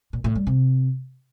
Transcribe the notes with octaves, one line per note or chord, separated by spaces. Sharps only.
A#2
A2
G3
C3